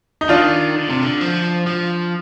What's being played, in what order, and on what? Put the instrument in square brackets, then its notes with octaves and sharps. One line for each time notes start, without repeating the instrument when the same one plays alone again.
[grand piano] D#4
[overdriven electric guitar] D#3 [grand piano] D4 F4
[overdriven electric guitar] D3
C3
D3
F3
F3